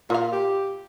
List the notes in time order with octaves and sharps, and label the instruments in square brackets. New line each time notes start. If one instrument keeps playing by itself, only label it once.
[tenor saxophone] A#2 [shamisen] F4 F5
[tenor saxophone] G4